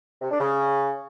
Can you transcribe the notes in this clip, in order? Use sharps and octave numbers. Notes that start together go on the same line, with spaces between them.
C3
D4
C#3